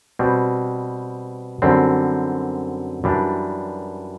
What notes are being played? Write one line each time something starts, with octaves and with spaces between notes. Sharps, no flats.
B2 G3 C4
F#2 D3 G3 C4
F#2 E3 G3 D4